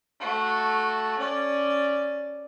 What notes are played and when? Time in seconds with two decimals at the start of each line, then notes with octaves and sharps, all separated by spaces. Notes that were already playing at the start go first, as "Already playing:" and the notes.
0.20 A3 F#4
1.19 C#4 D5